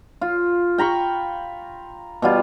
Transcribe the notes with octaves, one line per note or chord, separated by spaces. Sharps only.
F4
G5 A#5 B5 C#6
B2 G3 F4